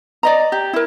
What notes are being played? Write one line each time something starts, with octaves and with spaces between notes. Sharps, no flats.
D5 D#5 A#5
G4
E4 A#4